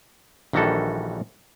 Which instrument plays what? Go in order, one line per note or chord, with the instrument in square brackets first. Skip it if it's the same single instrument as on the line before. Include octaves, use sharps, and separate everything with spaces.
[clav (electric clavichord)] A#1 D#3 E3 G3 F#4 A4